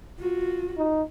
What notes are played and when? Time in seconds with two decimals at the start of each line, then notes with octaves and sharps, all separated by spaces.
0.19 F4 F#4
0.78 D#4